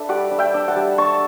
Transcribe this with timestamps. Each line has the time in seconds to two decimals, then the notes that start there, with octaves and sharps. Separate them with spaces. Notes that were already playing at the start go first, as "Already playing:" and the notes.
Already playing: D4 A4 B4 E5
0.09 G3 D5 F#5
0.31 D4
0.39 E5 G5
0.54 D4
0.68 F#5 A5
0.76 G3
0.98 D4 A5 C#6